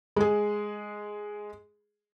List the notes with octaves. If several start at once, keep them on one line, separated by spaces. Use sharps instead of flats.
G#3 G#4